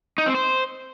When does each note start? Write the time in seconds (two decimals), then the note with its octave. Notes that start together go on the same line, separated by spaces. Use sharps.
0.18 D#4
0.26 C4
0.34 C5